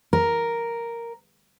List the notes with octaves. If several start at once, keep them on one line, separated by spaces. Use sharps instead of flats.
A#4